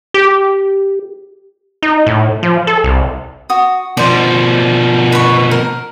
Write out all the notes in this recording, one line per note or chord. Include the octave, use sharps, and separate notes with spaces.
G4
D#4
A2
F3
A4
C2
F#4 D#6
B2 F3 C5 D5
B4 C#6
A#4